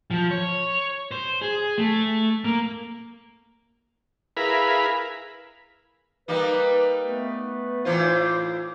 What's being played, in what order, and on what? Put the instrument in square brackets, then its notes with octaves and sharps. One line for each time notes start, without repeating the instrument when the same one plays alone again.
[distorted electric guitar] F3
C#5
C5
G#4
A3
A#3
[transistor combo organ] E4 G#4 A#4 B4 F5 B5
[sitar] G3 A#3 D#4 [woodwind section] B4
[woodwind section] A3 B3 B4
[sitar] A2 E3 F4 [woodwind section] C5